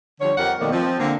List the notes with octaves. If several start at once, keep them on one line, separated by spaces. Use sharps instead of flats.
D3 F3 G3 C#5
F2 G4 A#4 F#5
F2 B2 D#3 A3 A#3 D5
F3 C4
D3 A#3 C4